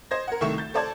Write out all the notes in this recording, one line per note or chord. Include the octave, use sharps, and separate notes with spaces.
C5 D#5 G#6 A#6
A#4 F#5
C2 D#3 A3 E5 C#6 E7
G6 A6
A4 C5 D5 A5 G#6